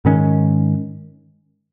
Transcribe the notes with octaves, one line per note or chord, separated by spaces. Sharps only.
G#2 D#3 G#3 C#4